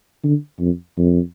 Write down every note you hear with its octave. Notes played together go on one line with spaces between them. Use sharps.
D3
F2
F2